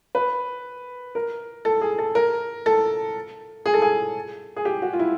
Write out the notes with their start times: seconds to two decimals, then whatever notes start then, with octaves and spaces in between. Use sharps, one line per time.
0.15 B4
1.15 A#4
1.65 A4
1.81 G#4
1.99 A4
2.15 A#4
2.66 A4
3.66 G#4
3.74 A4
3.82 G#4
4.56 G#4
4.65 G4
4.82 F#4
4.93 F4
4.99 E4